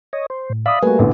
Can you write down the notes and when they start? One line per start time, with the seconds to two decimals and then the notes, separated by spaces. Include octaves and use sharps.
0.13 C#5 D#5
0.30 C5
0.50 A2
0.66 D5 E5 F5 B5 D#6
0.83 G3 A3 A#3 F#4 B4 G#5
0.99 A#1 E2 D3